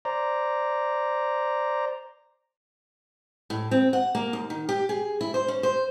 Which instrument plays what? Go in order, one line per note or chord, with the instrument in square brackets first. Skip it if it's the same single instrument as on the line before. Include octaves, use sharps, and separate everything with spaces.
[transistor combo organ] C5 D5 A#5
[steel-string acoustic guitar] A2
C4
F#5
A#3
D#2
D#3
G4
G#4
E4
C5
C#4
C5